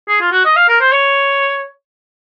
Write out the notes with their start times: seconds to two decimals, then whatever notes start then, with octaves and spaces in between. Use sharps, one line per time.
0.08 G#4
0.21 F4
0.32 F#4
0.45 D#5
0.56 F5
0.68 A#4
0.81 C5
0.92 C#5